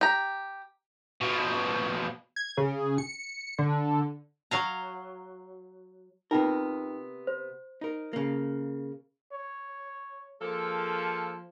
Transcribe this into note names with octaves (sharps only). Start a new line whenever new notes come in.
G4 A#5
B2 F3
G#6
C#3
C#7
D3
F#3 F5 A#5
C3 B3 D#4 F4 A#4 G5
C5
D#4 A#4
C#3 A#3
C#5
F3 G#3 A#3 A4